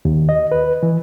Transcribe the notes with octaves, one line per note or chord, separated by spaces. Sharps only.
D#2
D#5
B4
E3